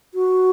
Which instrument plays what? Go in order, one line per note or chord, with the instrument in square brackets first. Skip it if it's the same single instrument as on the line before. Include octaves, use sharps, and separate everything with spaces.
[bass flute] F#4